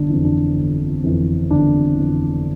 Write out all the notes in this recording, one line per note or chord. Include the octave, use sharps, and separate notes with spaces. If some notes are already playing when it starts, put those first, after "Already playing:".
Already playing: G1 D4
F2 E3
D4
G1
F2 E3
G1 D4
F2 E3